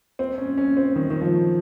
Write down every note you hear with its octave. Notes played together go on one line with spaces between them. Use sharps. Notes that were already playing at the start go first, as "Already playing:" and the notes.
C4
C#4
C#4
C4
D#3
D#3
F3